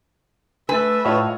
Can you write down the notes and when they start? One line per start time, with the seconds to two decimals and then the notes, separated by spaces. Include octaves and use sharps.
0.69 A3 B4 E5 G#5 A6
1.05 A2 F4 C#5 D#5